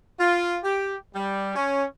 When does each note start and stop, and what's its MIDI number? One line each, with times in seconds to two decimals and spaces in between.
0.20 0.59 65
0.65 0.96 67
1.15 1.55 55
1.56 1.85 61